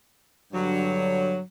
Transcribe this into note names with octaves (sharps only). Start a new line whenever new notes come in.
G2 D3 F#3